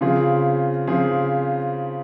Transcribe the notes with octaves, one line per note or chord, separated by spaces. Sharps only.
C#3 F3 C4 F4 G#4
C#3 F3 C4 F4 G#4